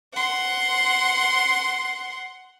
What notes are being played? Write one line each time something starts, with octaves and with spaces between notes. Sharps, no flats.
F#5 C6